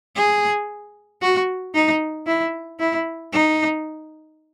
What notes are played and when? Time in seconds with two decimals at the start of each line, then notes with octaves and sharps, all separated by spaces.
0.16 G#4
1.22 F#4
1.75 D#4
2.27 E4
2.79 E4
3.33 D#4